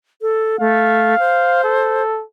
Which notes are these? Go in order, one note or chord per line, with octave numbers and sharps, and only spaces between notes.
A4
A3 F5
C5
A4